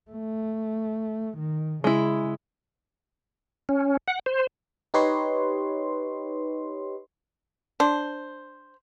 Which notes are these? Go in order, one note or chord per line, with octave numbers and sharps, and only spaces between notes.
A3
D#3
C#3 G#3 E4
C#4
F#5
C5
D#4 G4 B4 C#5 D#5 C6
D4 C5